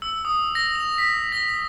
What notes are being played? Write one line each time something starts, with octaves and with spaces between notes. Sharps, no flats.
E6
D#6
A#6
F7
B6
A#6